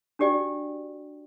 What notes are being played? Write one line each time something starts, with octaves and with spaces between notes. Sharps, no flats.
D4 F#4 G4 D5 G5